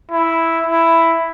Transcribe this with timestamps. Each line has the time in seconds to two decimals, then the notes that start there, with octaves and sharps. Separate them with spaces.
0.11 E4
0.67 E4